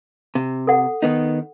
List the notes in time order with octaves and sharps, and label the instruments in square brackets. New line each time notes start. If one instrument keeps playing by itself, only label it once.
[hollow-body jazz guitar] C3
[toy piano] A4 F#5
[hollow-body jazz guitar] D#3 B3 D#4